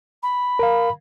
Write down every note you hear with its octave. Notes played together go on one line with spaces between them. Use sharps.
B5
A#4 F5